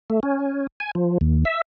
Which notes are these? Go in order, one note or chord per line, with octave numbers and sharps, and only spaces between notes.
A3
C#4
G#5
F3
D#2
E5